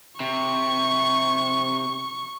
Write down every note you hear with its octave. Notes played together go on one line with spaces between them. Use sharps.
C3 C#6